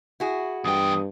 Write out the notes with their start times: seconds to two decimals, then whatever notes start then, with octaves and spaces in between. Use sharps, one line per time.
0.20 E4 F#4 G#4
0.65 E2 G2 G5 D#6